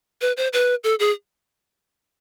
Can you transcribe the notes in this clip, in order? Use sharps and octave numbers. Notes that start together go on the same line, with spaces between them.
B4
C5
B4
A4
G#4